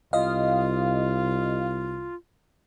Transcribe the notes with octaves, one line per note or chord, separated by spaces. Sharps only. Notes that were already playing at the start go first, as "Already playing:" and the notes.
C2 F4 D#5 F5